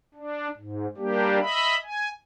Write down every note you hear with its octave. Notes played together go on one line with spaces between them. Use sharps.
D4
G#2
G3 A#3 D4 G4
D#5 E5 B5
G#5